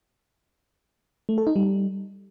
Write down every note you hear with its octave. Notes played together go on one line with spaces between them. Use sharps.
A3
A4
D#4
G3